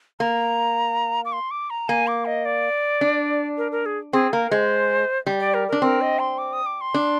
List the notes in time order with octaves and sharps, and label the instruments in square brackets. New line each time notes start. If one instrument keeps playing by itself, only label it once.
[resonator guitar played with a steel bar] A#3 [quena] A#5
[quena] D6
C6
D6
A#5
[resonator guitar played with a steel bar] A#3 [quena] G#5
[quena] D6
D#5
D5
[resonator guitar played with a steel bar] D4
[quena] A#4
A#4
G#4
[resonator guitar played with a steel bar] C4 [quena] G#4
[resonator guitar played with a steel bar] A#3 [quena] A#4
[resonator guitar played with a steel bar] G#3 [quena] C5
[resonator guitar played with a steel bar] G3
[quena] D5
A#4
[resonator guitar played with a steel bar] D4 [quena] A#4
[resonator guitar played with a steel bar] C4 [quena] A#4
[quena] D#5
C6
D6
D#6
D6
C6
[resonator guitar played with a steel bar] D4